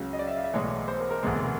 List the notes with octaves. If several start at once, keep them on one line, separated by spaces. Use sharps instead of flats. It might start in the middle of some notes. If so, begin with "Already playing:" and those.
Already playing: C#2 C#3 F#3
D#5
D5
E5
F5
E5
B1 A2 E3 G#3 C#5
C5
A#4
A#4
E1 D2 C3 E3 G#3